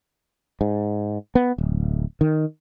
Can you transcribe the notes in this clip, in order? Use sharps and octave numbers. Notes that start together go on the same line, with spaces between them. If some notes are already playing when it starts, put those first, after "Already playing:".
G#2
B3
D1
D#3